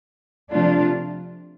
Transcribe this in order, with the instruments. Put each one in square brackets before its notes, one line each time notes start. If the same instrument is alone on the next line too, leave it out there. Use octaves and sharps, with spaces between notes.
[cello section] C3 F3 A3 D4 F4